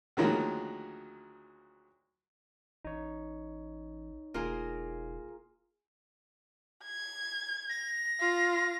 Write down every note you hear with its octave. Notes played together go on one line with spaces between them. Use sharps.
D2 D#3 F3 F#3 G#3 A#3
A1 D#4 C#5
E1 A#3 F4 G#4 A#4
G#6
A#6
F4